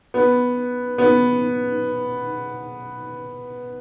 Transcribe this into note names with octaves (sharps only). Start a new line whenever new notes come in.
B3
B3